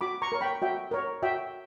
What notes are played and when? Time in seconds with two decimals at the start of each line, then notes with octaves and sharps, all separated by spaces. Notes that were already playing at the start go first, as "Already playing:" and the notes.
0.01 F#4 B5 D6
0.22 A#5 C#6
0.32 A#4 C#5
0.41 G5 B5
0.62 F#4 E5 G5
0.91 A#4 C#5
1.22 F#4 E5 G5